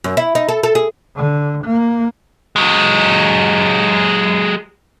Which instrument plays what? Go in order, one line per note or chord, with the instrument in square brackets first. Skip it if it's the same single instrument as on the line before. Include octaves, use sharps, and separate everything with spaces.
[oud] F#2
E4
D#4
A4
A4
G#4
[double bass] D3
A#3
[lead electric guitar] F#3 G#3